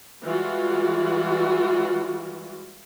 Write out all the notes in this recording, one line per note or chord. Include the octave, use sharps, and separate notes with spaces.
E3 G3 G#3 F4 F#4